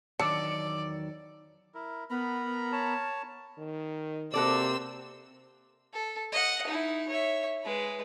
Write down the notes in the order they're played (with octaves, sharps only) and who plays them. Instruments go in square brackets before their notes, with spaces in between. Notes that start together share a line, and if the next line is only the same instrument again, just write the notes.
[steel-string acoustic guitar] E2 D#3 F#3 [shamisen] D4 [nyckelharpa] D5 [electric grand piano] D6 E6 C#7
[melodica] E4 A#4
[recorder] B3 [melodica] A#4 A#5 B5
[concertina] C#5 A5
[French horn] D#3
[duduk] C3 [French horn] A#3 [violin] C4 E6 [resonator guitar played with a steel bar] F#4 A4 D5
[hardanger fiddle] A4
D#5 F#5
D#4 E4
C#5 E5
G#3 B4